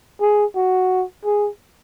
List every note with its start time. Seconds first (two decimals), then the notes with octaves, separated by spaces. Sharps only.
0.21 G#4
0.56 F#4
1.25 G#4